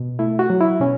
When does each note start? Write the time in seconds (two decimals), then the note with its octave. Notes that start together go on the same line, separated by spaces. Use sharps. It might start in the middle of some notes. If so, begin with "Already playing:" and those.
Already playing: B2
0.19 A3 E4
0.39 F#4
0.50 F#3
0.61 E4
0.80 B2 C#4